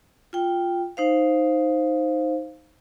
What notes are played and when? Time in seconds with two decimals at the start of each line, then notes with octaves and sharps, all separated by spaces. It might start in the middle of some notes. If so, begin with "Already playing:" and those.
0.33 F4 G5
0.97 D#4 C5 F5